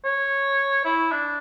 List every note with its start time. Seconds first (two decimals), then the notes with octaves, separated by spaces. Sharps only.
0.05 C#5
0.85 E4
1.12 D4